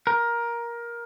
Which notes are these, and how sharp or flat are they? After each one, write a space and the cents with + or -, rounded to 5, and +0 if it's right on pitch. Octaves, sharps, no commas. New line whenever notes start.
A#4 +15